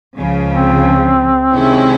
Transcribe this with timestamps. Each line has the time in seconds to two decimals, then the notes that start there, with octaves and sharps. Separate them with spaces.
0.18 C#2 C#3 F3
0.52 C4
1.54 C3 D#3 G#3 C#4 E4